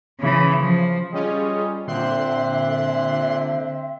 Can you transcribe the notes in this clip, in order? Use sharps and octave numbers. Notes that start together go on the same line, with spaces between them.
C#3 E3
F3
G3 C#4 F4 G#4 D#5
A#2 D3 C4 E5 C6 F#6